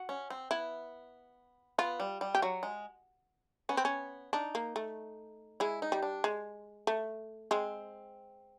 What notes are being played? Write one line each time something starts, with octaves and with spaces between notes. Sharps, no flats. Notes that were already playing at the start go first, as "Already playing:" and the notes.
Already playing: F#4
C#4
C4
B3 E4
B3 F4
G3
G3
G4
F#3 F#4
G#3
B3 C#4
C4
C#4
D4 D#4
A#3
A3
G#3 E4
D#4
G3
D4
G#3
A3
G#3 C4